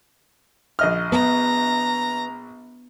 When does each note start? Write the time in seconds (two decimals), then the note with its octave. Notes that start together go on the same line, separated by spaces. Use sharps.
0.79 A#1 D#5 F6
1.12 B3 A#5